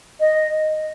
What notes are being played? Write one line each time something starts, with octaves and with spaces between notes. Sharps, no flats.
D#5